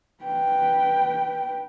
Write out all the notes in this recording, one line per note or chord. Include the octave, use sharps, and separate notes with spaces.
B4 G5